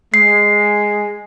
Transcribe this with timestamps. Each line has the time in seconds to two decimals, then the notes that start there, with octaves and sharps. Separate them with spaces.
0.14 G#3 C7